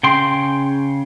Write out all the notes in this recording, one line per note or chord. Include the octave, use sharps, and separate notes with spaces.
C#3 G5 C6